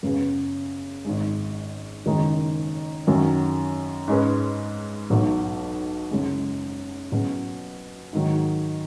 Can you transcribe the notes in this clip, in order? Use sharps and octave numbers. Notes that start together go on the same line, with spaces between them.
F#2 C#3 B3 G#4
G#1 G#2 G#3
F#1 F#2 D#3 G#3 D#4
F#2 D#3 F#3 C#4
G#2 G#3 C#4 B4
B1 B2 F#3
F#1 F#2 C#3 G#3
B2 F#3 C#4 G#4
G#2 D#3 F#3